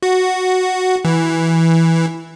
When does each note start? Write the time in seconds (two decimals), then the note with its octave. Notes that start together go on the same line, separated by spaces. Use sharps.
0.03 F#4
1.05 E3